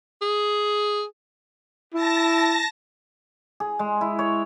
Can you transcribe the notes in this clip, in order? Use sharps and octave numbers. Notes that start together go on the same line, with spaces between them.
G#4
E4 A5 A#6
G#4
G#3
E4
C#5